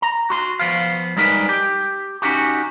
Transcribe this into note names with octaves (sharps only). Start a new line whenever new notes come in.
A#5
F#4 C6
F3 B3 F5
G3 G#3 D#4 A#4 B4
G4
C#4 D#4 F#4 G4